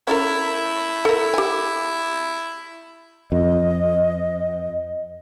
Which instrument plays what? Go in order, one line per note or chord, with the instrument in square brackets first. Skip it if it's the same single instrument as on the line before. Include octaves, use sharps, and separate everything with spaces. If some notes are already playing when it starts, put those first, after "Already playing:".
[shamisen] C#4 A4 A#4 [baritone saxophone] E4
[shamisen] A4 A#4
G4 G#5
[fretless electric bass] F2 [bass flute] D#5